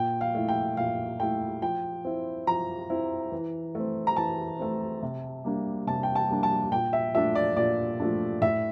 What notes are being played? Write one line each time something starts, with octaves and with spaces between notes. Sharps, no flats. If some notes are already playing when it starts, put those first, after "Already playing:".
Already playing: A#2 G5
F5
A3 E4
G5
A#2 F5
A3 E4 G5
F3 G5
C4 E4
F3 A#5
C4 E4
E3
A3 C4
A#5
E3 A5
A3 C4
C3
G3 A#3 D4
C3 A5
G5
A5
G3 A#3 D4
A5
A#2 G5
E5
F3 A3 D4 E5
D5
A#2 D5
F3 A3 D4
A2 E5